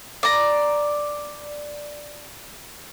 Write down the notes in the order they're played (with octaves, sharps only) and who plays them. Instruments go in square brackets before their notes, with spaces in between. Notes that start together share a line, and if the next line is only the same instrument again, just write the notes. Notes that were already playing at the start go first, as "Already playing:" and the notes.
[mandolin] D5 A#5